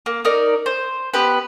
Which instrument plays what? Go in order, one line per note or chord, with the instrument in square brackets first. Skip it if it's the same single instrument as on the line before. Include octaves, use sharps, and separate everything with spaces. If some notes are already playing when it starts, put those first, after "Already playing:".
[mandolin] A#3
D#4 A#4 D5
C5
B3 G4 B4